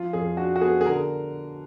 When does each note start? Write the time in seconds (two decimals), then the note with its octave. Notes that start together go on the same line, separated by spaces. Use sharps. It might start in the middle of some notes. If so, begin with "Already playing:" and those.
Already playing: F3 F4
0.13 F2 G#4
0.37 D4 F#4
0.56 F#4
0.61 B3 G#4
0.81 G#4
0.85 D3 A#4